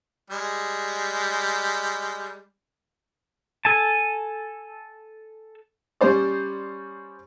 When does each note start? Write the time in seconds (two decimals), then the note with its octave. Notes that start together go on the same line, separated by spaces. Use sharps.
0.30 G3 G#3
3.65 A4 G#5 A5
6.01 G3 C#4 C5 D5